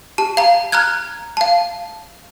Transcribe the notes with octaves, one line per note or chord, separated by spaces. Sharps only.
G4 A5
F5 A#5
A#5 F6 F#6 G#6
F5 A5